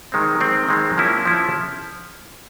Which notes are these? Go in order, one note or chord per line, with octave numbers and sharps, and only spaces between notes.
D#3 G#3 C4
D#3 G#3 C4
D#3 G#3 C4
F3 A#3 C#4 E4
F3 A#3 C#4 E4